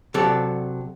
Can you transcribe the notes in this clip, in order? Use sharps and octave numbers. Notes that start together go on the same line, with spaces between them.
C3 F#3 A4 D5